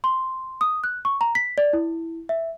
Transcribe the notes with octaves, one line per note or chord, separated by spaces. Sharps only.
C6
D#6
F#6
C#6
A#5
B6
D5
E4
E5